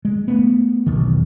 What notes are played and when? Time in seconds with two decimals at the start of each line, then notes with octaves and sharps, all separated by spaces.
0.05 G#3
0.28 A3 B3
0.86 E1 B1 E2 D#3